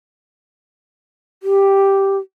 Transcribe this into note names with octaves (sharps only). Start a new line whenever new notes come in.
G4